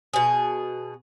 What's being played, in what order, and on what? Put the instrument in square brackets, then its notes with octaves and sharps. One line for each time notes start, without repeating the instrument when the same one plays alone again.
[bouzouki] B2 G#4